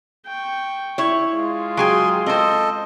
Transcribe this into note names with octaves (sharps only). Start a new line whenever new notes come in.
G5 C#6
E4 C#5
G#3 F4
F#3 G#4 G5 G#5 C6
C4 A4 C5 D#5